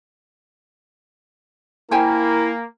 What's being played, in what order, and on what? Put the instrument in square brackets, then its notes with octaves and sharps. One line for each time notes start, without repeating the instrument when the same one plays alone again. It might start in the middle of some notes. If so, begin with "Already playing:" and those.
[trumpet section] A#3 [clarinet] E4 [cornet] A#4 [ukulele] C5 G5 G#5